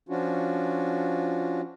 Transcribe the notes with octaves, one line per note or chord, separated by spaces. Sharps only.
F3 C#4 D4 F4 F#4